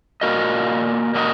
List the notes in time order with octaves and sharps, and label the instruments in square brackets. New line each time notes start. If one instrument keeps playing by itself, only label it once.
[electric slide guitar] A#2 A#3 F#4 A#4 D#5
A#2 A#3 F#4 A#4 D#5